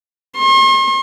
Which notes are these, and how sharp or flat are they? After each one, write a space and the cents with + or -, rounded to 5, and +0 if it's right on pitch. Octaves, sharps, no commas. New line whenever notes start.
C6 +45